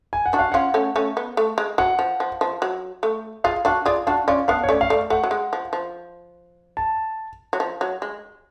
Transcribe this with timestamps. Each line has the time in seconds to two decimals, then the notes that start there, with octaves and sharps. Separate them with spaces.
0.13 G#5
0.26 F#5
0.33 D4 F#4
0.39 F5
0.52 C#4 F4 F#5
0.74 A3 C#4
0.96 A3 C#4
1.17 B3
1.37 A3
1.58 G#3
1.78 F#3 F#5
1.99 F3
2.20 F3
2.41 F3
2.62 F#3
3.03 A3
3.44 F4 G#4 F5
3.65 D4 F#4 F5
3.86 F4 G#4 D5
4.07 D4 F#4 F5
4.28 C#4 F4 D5
4.48 B3 D4 F5
4.63 C#5
4.69 A3 C#4 D5
4.81 F5
4.90 A3 D5
5.10 A3 F#5
5.24 F#3
5.31 G#3
5.53 F3
5.73 F3
6.77 A5
7.53 F#3
7.60 F3
7.81 F#3
8.02 G#3